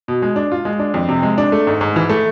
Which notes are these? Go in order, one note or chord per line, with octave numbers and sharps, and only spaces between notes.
B2
G#3
D4
F4
G#3
D4
F2
C3
G#3
D4
A3
G#2
G#2
E3
A3